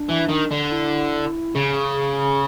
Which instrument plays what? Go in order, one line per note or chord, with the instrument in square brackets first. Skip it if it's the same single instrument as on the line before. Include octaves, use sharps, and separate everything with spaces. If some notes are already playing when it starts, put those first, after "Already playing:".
Already playing: [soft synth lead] D4
[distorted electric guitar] E3
D#3
D3
[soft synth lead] E4
[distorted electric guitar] C#3 [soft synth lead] G#4